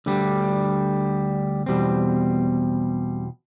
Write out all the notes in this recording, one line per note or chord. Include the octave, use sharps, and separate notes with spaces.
D2 D3 G3
E2 B2 G3 C4